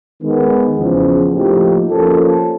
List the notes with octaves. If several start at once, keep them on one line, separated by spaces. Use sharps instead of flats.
D#3 G#3 B3
E2 C#3 F3
A2 F3 A#3 D#4 G4
F3 A#3 C#4 F4 A4